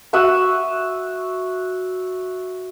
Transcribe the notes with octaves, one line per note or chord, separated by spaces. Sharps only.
F#4 E5 F#5 D#6